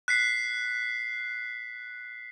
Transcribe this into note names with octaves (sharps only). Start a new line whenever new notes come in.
F#6 B6 C7